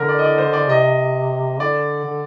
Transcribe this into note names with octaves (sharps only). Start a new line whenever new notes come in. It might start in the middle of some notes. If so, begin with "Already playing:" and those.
Already playing: D3 A#4
D5
D#5
D5
C5
D5
C3 D#5
D3 D5
D3